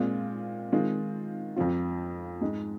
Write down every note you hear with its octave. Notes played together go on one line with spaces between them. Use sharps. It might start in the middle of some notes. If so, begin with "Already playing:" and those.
Already playing: A#2 G#3 C4 F4
D#3 G#3 C4 F4
F2 F3 C4 F4
G#2 G#3 D#4